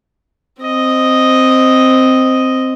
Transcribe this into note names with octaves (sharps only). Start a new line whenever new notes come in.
C4 D#5